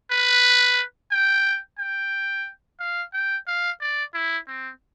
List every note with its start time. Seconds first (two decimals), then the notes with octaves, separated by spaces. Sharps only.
0.11 B4
1.11 G5
1.79 G5
2.80 F5
3.13 G5
3.47 F5
3.80 D5
4.14 E4
4.47 C4